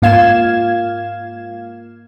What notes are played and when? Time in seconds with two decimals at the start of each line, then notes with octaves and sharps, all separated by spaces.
0.02 G#2 A#3 F4 F5 G#6 E7